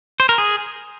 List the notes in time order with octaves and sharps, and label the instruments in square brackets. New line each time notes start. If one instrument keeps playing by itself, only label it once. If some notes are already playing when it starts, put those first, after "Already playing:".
[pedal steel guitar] C5
A#4
G#4